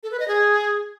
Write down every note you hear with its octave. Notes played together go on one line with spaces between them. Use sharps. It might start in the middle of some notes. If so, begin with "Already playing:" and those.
A4
B4
D#5
G#4